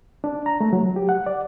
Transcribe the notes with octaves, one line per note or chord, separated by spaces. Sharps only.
D4
A#5
A3
F#3
G4
F#5
D5